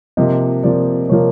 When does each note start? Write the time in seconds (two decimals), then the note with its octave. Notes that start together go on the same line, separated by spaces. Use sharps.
0.17 C3 F3 A#3 D#5
0.63 C3 F3 A#3 D5
1.10 C3 F3 A#3 C#5